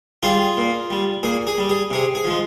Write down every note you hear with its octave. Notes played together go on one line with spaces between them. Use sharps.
G3 F4 G#4
A#2
G3
A#2 G#4
G#4
G3
G#4
C3 G#4
G#4
F3 G#3